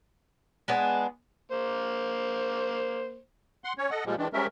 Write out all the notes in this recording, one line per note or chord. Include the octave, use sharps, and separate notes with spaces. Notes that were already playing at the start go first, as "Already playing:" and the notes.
G#3 B3 D4 G#4
A#3 C5
F#5 C6
C#4 C#5
A4 D#5 F#5
A#2 F3 G3 G#3
D#3 E3 G#3 D4
F3 G3 G#3 C#4 A#4 E5